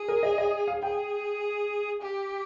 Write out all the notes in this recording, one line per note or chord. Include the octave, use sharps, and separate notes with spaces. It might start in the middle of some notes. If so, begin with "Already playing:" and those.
Already playing: G#4
A#4
D#5
D#5
F5
G#4 G5
G4